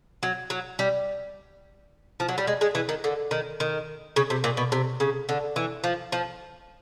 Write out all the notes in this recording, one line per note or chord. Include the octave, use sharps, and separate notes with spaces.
F#3
F#3
G3
F3
F#3
G3
G#3
G#3
E3
D#3
D3
D#3
D#3
C#3
C3
A#2
B2
C3
C#3
D3
E3
F3
F3